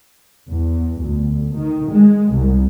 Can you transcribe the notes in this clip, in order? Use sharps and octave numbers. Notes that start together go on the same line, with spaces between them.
E2
D2
D#3
G#3
C2